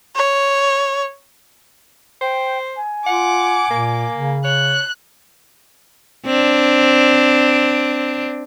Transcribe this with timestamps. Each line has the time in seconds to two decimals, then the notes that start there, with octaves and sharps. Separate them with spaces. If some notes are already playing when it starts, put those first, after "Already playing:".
0.16 C#5
2.21 C5 G5
2.76 G#5
3.06 F4 F#5 D6
3.70 A#2 A#3
4.14 C#3
4.45 C#5 F#6
6.25 C4 D4